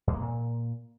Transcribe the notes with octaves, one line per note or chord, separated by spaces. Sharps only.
G2
A#3
A#2